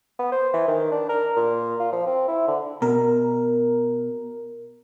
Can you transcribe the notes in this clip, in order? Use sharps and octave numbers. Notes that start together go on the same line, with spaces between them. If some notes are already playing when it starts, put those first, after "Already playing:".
B3
C5
E3
D#3
D4
A#4
A#2
F4
F3
C4
E4
D3
B2 A#4